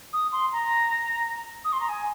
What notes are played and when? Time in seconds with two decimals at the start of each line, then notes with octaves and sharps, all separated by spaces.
0.13 D#6
0.32 C6
0.52 A#5
1.65 D#6
1.73 C6
1.80 A#5
1.89 G#5